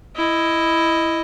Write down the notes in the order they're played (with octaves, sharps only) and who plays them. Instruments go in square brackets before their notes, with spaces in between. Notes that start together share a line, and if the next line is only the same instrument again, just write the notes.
[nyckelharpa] E4 D#5